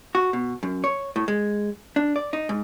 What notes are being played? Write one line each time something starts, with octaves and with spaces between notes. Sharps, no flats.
F#4
B2
F#2
C#5
A2
G#3
D4
D5
D#4
G#2